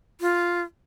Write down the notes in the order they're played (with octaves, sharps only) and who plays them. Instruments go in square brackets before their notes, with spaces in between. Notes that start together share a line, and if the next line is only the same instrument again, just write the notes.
[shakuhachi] F4